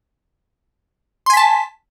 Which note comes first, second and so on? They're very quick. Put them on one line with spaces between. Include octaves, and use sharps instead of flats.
C6 G#5 B6 A5